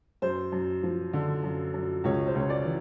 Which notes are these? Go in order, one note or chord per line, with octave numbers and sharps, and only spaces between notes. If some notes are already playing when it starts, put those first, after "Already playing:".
F#2 C5
F#2
F3
D3
F#2
F#2
C#2 C#5
C5
C#2 C#5
D5
E3